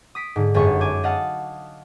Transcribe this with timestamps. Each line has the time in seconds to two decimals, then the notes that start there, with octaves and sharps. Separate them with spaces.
0.15 D#6 B6 D7
0.36 G#2 D3
0.54 G1 F#2 G#3 G#4 C#6
0.81 G#5 D6 G#6
1.04 D#5 F5 F#5 A5 D#6